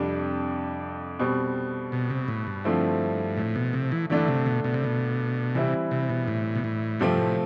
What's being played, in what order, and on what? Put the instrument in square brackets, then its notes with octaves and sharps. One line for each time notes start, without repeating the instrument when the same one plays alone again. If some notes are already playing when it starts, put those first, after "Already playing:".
Already playing: [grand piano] F2 C3 G3 D4
B2 G3 C4
[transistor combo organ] B2
C3
A2
G2
[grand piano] D3 F3 A3 C4 E4
[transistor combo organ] A2
B2
C3
E3
[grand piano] G2 D3 A3 D4 [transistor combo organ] E3
[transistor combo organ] C3
B2
B2
C3
B2
[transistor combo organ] C3 [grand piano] E3 G3 C4 E4
[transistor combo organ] C3
B2
A2
B2
A2
[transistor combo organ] G2 [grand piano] C3 F3 A3 C4
[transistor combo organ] A2